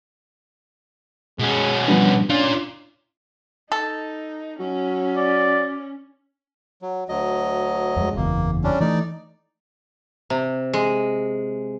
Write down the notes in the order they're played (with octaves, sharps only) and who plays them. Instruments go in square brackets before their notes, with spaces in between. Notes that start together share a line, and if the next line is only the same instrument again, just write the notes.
[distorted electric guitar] B2 C#4 [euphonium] G#3
[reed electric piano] F3 G3 D4 [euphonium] B3
[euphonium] C#4 [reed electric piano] D4 [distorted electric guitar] F4 D5
[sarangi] D#4 [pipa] A4
[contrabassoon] F#3 [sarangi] C#4
[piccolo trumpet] D5
[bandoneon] F#3
D2 F#3 D#5
[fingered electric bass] F2 G#3
[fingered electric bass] F#1 E2 [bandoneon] A#3
[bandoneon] G3 C#4 D4
[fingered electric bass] E3 A3 [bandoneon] D#4 D5
[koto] C3
G#3